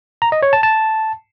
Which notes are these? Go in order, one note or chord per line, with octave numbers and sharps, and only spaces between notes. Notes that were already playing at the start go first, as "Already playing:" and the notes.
A#5
D#5
C#5
A5
A5